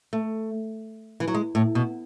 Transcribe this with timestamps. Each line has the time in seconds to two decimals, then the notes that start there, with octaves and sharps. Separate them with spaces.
0.13 A3
1.20 E3
1.28 F#3
1.34 G#3
1.55 A2
1.75 B2